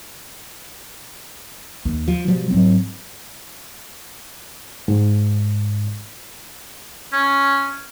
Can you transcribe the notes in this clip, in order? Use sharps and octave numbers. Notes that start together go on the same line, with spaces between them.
D#2
F3
B2 F3 G3
G#2 F#3 C4
G#2
C#4